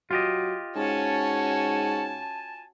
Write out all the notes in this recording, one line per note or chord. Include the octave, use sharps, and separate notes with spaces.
F#3 F4 G4 D#5
G#2 C#4 F#4 G#5 A5